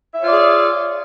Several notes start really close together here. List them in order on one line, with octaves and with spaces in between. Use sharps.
E5 C#5 F4 D5 G#4